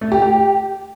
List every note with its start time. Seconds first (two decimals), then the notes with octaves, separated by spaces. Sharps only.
0.01 A3
0.12 G4
0.22 G4